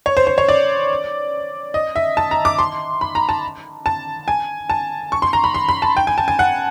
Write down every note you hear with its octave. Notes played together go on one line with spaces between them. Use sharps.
C#5
C5
C5
C#5
D5
D#5
E5
A5
A#5
D6
C6
B5
A#5
A5
A5
G#5
A5
C#6
C6
A#5
B5
C6
B5
A5
G5
G#5
A5
G#5
F#5